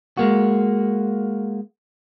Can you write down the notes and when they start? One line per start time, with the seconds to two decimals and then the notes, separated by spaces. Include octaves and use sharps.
0.17 G#3 A#3 F#4